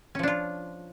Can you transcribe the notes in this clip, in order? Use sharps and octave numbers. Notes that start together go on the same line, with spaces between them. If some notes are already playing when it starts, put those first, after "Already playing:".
F3 C#4 D4 F4